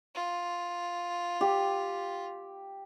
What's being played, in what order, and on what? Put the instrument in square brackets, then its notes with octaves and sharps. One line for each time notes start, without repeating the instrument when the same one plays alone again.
[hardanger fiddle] F4
[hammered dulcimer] G4